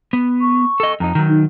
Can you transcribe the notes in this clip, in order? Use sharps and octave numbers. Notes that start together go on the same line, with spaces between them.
B3
C#6
A4 D#5
F2 D#4 A#5
D#3 F#3
D#4